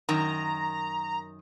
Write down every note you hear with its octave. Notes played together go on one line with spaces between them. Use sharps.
F#2 D#3 A#5